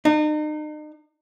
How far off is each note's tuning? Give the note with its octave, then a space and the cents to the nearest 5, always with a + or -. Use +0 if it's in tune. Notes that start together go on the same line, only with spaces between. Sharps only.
D#4 -40